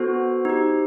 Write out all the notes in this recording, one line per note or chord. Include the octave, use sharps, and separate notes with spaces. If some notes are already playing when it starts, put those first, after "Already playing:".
Already playing: B3 F#4 A4 C5
D#4 G4